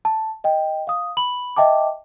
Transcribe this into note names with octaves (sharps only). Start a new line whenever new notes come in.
A5
D#5 G5
F5 D#6
B5 F#7
D#5 E5 G5 A5 D6